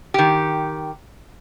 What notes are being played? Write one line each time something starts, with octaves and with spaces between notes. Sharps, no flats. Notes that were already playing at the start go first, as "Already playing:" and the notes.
D#3 G4